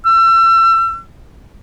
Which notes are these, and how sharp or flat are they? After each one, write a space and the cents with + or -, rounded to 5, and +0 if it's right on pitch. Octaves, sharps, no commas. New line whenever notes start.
E6 +35